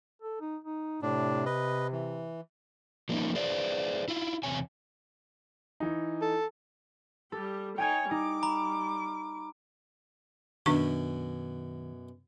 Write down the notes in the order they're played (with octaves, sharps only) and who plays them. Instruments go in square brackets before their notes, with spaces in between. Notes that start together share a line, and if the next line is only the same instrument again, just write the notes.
[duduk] A4
D#4
D#4
[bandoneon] A2 D4 [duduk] C3
[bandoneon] B4 D#5
E3
[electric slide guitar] F3 G#3 A#3 C4 C#4 D#4
G#4 B4 C5 D5
E4 F4
E2 C3 C#5 G#5
[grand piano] E3 D#4
[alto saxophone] A4
[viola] G3 G4 [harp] A4
[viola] D#4 C#5 [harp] G5 G#5 G#6
[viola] G3 D6 [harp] D#4
[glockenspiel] A#5 B5
[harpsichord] F#2 B2 [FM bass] D#3 [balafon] D4 C#6